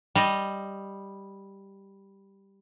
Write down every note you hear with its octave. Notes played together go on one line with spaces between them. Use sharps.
G3 D#5